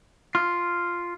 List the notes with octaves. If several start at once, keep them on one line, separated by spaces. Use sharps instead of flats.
F4